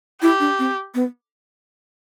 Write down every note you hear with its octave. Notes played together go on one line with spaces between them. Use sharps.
E4 G4
D4
C4
B3